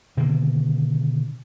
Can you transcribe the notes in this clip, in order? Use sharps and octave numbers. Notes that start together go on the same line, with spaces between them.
B2 D3 D#3 A#3